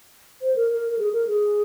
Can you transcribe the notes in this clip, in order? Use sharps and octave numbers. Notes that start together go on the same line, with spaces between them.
C5
A#4
A#4
A#4
G#4
A#4
G#4